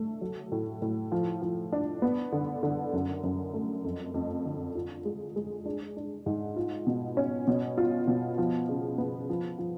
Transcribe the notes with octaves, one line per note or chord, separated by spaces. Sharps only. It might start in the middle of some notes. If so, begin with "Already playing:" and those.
Already playing: D3 A3
F#3
A2
A2
F3
F3
D4
B3
D3
D3
F#2
F#2
A3
F2
F2
D3
F4
G#3
G#3
D4
D4
G#2
F4
B2
C#4
B2
F4
B2
F3
C#3
B3
F3
F3